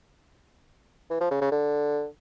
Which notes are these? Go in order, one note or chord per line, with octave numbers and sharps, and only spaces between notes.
E3
F3
C#3
C#3
D3